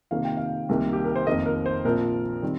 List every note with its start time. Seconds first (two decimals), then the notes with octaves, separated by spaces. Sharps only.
0.11 F2 C3 D#3 A#3 F5
0.24 G5
0.37 F5
0.69 C2 C3 D#3 A#3
0.93 G4
1.05 A#4
1.16 C5
1.27 F1 F2 D#3 A#3 D#5
1.46 A#4
1.66 C5
1.84 A#1 A#2 F3 C4 A#4
2.42 D#3 G3 C4 D#4